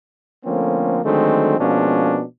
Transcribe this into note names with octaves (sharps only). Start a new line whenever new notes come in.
D3 F3 A3 A#3 C4 C#4
D3 D#3 F#3 G#3 A3 C4
B2 F3 G#3 A#3 C#4 D4